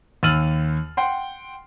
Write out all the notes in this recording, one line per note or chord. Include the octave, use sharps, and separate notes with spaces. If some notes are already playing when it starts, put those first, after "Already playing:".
D#2 E6 F6 A6 D#7 F#7
F#5 G5 C6